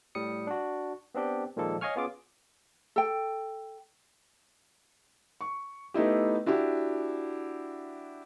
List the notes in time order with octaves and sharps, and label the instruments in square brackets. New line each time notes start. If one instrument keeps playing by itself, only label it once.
[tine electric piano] A2 G3 D#6 C#7
D4 F#4
B3 C4 D4 G4
A#2 D#3 F3 G#3 A#3 A4
C#5 D#5 F5 G#5 C#6 F6
B3 C#4 F4 G#4 D6
[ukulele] A4 G5
[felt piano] C#6
A3 B3 D#4 E4 G4
D4 E4 F#4 G4